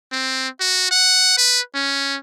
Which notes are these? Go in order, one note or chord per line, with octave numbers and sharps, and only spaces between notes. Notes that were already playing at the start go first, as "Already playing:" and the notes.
C4
F#4
F#5
B4
C#4